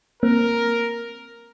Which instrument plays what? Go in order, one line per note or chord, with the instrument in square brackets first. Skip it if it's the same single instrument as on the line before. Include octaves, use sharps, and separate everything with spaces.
[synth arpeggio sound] A#3 C4 [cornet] A#4